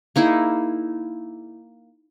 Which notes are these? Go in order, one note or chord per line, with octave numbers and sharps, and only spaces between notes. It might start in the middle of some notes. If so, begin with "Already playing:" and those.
A#3 D#4 E4 G#4